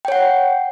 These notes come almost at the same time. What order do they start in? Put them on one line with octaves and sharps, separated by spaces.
G5 C#5 F#5